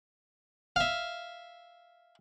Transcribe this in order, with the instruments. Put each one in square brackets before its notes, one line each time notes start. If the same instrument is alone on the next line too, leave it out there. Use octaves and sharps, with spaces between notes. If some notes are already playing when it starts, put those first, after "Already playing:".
[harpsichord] E5 F5